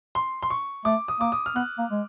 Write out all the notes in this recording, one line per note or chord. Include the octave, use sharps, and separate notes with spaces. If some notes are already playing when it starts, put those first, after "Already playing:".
C6
C6
C#6
A3 D6
D#6
A#3 D6
D#6
F6
B3 F#6
A#3
G#3